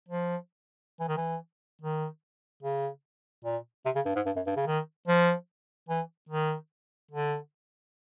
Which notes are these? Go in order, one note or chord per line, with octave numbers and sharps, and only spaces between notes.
F3
E3
D#3
E3
D#3
C#3
A#2
C3
C#3
G2
G#2
G2
F#2
G2
C#3
D#3
F3
E3
D#3
D3